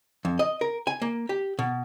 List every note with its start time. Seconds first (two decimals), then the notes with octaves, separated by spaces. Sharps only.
0.25 F2
0.39 D#5
0.61 A#4
0.87 G#5
1.02 A#3
1.29 G4
1.59 B2